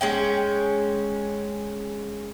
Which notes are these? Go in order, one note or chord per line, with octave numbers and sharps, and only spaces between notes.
G#3 C#4 G5